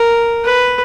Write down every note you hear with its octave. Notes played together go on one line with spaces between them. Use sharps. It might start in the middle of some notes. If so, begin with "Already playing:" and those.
Already playing: A#4
B4